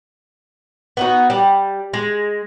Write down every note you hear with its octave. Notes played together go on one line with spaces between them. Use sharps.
B3 D#4 F#4
G3
G#3